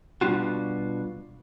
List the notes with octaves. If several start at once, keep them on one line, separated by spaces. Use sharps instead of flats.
B2 G3 D4 F4 F#4